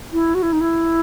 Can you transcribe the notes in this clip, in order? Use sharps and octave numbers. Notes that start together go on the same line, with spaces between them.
E4
F#4
E4
D#4
E4